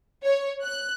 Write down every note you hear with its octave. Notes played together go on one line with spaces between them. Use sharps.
C#5
F#6